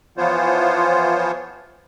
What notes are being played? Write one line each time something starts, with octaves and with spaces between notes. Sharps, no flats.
E3 F3 B3 F4 C5 C#5